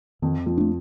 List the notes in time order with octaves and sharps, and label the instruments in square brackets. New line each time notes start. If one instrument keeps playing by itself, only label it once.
[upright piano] F2 F3 [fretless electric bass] D#3
[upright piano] F2 F3
[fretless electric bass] A3 D4